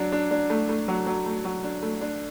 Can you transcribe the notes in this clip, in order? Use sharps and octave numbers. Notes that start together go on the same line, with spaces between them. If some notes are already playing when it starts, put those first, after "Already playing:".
Already playing: F#3 D4
D4
D4
A3
A3
F#3
F#3
A3
F#3
D4
A3
D4